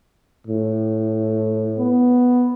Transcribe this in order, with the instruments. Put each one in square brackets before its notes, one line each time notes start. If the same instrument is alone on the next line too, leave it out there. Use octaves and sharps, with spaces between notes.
[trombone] A2
[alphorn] B3